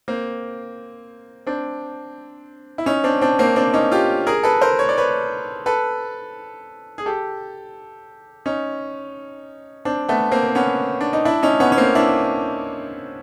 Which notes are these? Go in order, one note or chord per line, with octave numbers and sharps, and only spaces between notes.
A#3 C4
C4 D4
E4
C#4 D#4
C4 D4
C4 D4
A#3 C4
C4 D4
C#4 D#4
F4 G4
G#4 A#4
A4 B4
A#4 C5
C#5
D5
B4 C#5
A4 B4
G#4
G4 A4
C#4 D#4
C4 D4
A3 B3
A#3 C4
C4
B3 C#4
D4
D#4
D4 E4
C#4 D#4
B3 C#4
C#4
A#3 C4
D4 E4